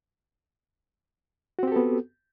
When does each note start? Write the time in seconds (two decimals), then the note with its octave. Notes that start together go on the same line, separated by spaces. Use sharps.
1.59 F#4
1.63 C4
1.67 G4
1.72 A4
1.76 B3